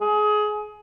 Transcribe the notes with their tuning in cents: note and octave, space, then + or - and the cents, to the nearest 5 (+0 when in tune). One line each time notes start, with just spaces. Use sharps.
G#4 +25